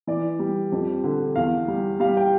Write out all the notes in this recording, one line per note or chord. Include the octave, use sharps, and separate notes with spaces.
E3 D5
G3
F2
D3
E2 F5
G3
G3 F5
G5